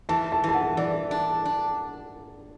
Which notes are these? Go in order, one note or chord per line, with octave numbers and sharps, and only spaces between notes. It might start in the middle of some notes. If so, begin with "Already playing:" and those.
E3 A5
A5
E3
A5
F#5
E3 D5
D4
D4